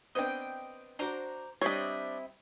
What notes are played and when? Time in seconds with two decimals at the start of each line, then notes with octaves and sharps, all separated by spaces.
0.15 B3 C4 D4 D#5 G5
0.99 D4 F#4 C5 A#5 D6
1.61 G3 C4 D4 E4 C#5 D#5